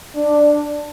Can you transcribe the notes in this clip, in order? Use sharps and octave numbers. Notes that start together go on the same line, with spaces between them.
D4